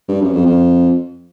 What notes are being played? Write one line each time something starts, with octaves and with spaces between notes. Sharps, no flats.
G2
F#2
F2
F2